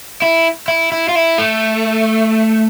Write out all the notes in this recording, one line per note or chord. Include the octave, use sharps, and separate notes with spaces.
E4
E4
E4
F4
E4
A3